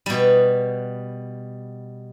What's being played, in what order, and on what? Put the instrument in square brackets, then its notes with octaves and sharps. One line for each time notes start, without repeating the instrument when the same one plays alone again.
[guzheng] B2 G3